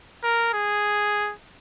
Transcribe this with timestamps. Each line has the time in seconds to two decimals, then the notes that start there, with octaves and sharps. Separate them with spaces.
0.23 A#4
0.53 G#4